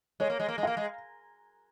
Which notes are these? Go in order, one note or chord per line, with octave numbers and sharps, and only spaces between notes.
G#3 C#5
A#3
G#3
A#3
G#3
A#3 F5
G#3